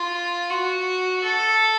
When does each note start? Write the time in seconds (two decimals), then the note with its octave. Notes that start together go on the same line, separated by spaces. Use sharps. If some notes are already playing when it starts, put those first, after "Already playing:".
Already playing: F4
0.50 F#4
1.23 A4